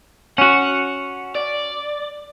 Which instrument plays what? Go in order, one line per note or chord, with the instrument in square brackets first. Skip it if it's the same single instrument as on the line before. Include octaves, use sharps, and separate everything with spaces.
[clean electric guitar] C#4 F#4 [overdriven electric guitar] F#5
[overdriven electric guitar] D5